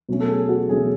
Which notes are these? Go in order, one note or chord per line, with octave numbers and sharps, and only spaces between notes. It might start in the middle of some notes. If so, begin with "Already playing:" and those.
B2 F#3 A3 C#4
A4
G#4
F#4
B2 F#3 A3 C#4 G#4